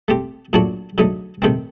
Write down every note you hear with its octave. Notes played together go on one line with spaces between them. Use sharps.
A3 C4 G4
A#2 F#3 A3 D4 F#4
D3 F#3 A3 D#4
C3 D#3 A3 C4